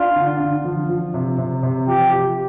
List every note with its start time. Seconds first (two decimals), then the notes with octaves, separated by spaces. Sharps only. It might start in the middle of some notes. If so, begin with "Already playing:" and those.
Already playing: D4 F4
0.16 D3
0.40 D3
0.65 F3
0.89 F3
1.14 C3
1.38 C3
1.63 C3
1.87 F3 G4
2.12 G4